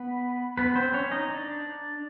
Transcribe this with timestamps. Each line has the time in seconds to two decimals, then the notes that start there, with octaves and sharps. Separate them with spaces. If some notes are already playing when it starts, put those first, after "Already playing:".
Already playing: B3 B4
0.58 B3 B4
0.75 C4 C5
0.94 C#4 C#5
1.11 D#4 D#5
1.30 D4 D5